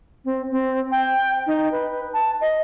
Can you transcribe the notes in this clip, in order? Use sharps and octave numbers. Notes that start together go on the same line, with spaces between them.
C4
C4
G5
D#4
B4
A5
D#5